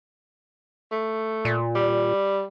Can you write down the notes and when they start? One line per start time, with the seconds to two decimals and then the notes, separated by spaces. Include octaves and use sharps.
0.91 A3
1.45 A#2
1.75 G3